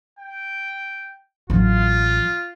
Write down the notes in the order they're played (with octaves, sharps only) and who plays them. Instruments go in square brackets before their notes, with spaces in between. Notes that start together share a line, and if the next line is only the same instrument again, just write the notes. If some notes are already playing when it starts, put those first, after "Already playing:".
[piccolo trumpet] G5
[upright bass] A1 F#3 [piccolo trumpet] F4